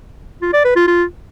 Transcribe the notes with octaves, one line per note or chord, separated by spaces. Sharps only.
F4
D5
B4
F4
F4